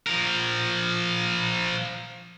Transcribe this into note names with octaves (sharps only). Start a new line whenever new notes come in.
F3 A#4